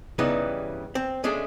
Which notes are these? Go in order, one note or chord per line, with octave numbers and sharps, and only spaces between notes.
G2 C#3 E3 G3 B3 D#4
C4
G#3 A3 C#4 D4 G#4